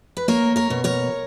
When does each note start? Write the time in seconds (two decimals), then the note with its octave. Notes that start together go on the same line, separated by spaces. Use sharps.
0.17 B4
0.28 A#3 A#4 C#5
0.56 A#4 C#5
0.70 B2
0.84 A#4 C#5